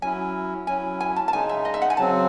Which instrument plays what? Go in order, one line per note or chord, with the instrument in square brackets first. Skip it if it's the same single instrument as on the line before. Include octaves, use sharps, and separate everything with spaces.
[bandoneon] F#3 C#4 E4 [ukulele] G#5
[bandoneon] F#3 C#4 E4 [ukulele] G#5
[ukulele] G#5
A5
A5
[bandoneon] C#3 G#3 D#4 [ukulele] G#5
[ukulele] E5
D#5
E5
F#5
G#5
[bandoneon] C#3 F#3 C4 [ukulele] A5